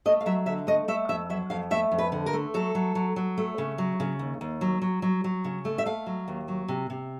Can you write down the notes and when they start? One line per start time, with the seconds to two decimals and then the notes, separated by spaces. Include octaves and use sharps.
0.05 A3 D#5
0.21 F5
0.26 F#3 E5
0.46 D3 E5
0.67 A3 D#5
0.88 A3 E5
1.09 F2 E5
1.30 F#3 E5
1.50 F2 F5
1.71 A3 E5
1.92 F2
1.98 B4
2.12 D3
2.26 A#4
2.33 A3
2.54 F#3 A4
2.75 F#3
2.95 F#3
3.16 F#3
3.38 A3
3.58 C#3
3.78 F#3
4.00 C#3
4.19 D#2
4.41 D#2
4.61 F#3
4.82 F#3
5.02 F#3
5.24 F#3
5.44 C#3
5.65 A3
5.78 E5
5.86 A3 F5
6.07 F#3
6.28 D#2
6.48 F#3
6.68 C3
6.90 C3